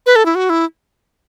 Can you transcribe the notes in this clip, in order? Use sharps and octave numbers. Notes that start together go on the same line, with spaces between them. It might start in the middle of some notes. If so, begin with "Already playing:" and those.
B4
A4
E4
F#4
E4